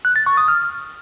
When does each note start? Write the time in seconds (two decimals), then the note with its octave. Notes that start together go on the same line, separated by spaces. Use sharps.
0.05 F#6
0.16 A6
0.26 C#6
0.37 D#6
0.48 F6